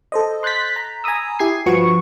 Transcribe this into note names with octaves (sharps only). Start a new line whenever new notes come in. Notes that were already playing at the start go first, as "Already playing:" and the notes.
A4 C5 D#5
C6 F#6 G6 A6 B6
A#5
G#5 A#5 B5 D#6 E6
E4 G4 G#5 G#6 C7
G2 F3 F#4 B4 C#6